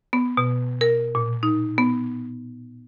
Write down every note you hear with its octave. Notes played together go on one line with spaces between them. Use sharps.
B3
B2
A#4
A#2
D#4
B3